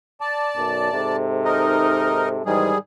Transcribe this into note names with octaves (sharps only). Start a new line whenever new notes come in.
D5 A5
B1 F#2
G#2 C3 A4
D#4 A#4 D#5
G#2 D#3 E3 G3 G#4